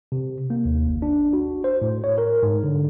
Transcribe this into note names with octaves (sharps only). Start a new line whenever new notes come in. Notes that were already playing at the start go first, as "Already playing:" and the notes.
C3
A#3
D#2
G1
D4
F#4
C5
A2
C#5
A#4
G#2
D3